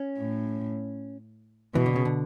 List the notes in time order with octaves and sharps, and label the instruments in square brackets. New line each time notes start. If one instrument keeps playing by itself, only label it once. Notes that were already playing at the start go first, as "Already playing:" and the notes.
Already playing: [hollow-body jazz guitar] C#4
[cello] A2
[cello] B2 [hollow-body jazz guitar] E3
[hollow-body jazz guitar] D3
C#3
D3